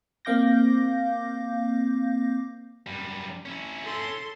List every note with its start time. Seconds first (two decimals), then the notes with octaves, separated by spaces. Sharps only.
0.25 A#3 C4 F5 D6 G6 A#6
2.87 F#2 G3
3.46 C#4 E4
3.84 A4 C6